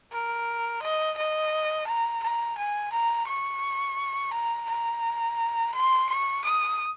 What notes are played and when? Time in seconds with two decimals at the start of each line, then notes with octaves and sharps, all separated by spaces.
0.12 A#4
0.83 D#5
1.18 D#5
1.87 A#5
2.23 A#5
2.58 G#5
2.93 A#5
3.28 C#6
4.33 A#5
4.70 A#5
5.75 C6
6.10 C#6
6.45 D#6